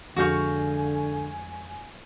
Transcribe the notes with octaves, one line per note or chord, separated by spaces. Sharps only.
F2 D3 G#3 F#4 F5 G#5 C#6 G6